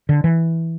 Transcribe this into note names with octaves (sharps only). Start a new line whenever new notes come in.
D3
E3